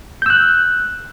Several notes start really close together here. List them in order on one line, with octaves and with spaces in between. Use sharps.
G6 E6 F#6